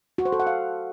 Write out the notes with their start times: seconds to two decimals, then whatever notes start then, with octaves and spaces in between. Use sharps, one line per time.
0.18 F#4
0.25 C5
0.32 A4
0.40 F#5
0.47 F5